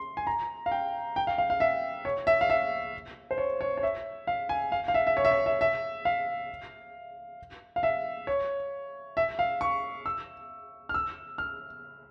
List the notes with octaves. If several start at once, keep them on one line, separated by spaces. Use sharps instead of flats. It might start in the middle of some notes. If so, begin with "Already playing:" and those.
Already playing: C6
G#5
A#5
F5
G5
G5
F5
F5
F5
E5
C#5
E5
F5
E5
C5
C#5
C#5
C#5
E5
F5
G#5
F5
F5
E5
E5
C#5
E5
C#5
E5
E5
F5
F5
E5
C#5
E5
F5
C#6
E6
F6
E6
F6